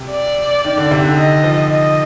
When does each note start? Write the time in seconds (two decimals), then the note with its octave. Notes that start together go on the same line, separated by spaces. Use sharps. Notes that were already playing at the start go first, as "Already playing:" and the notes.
Already playing: C3
0.11 D5
0.65 D#3
0.77 D3
0.91 C3
1.04 D3
1.17 D#5
1.44 F3
1.71 D#5